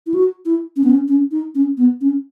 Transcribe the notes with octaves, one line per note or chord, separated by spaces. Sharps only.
E4
F#4
E4
C#4
B3
C#4
C#4
D#4
C#4
B3
C#4